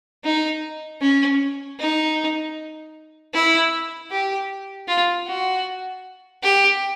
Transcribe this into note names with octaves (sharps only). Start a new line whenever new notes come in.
D#4
C#4
D#4
E4
G4
F4
F#4
G4